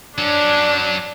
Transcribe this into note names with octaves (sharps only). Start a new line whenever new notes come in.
F#3 C#4 D4